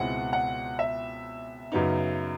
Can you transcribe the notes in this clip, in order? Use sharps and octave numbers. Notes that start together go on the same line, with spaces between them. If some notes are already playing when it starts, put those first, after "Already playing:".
Already playing: C#2 B2 G#3 C4 E4 F#5
F#5
E5
F#2 C#3 F#3 B3 D#4